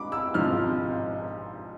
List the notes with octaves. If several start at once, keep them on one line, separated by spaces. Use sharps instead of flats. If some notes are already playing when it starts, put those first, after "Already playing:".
Already playing: G#2 G#3 D4 B5 D6
E6
G#1 G#2 F3 G#3 D4 F6